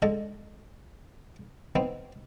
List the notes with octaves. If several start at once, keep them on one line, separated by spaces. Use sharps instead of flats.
D3 G#3 A4 D#5
B3 C4 D#4